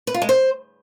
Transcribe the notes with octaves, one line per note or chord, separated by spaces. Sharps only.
B4
F4
G#3
C5